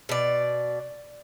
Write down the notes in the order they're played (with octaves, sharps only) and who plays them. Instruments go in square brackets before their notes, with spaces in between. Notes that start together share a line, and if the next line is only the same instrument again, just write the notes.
[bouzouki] B2 D5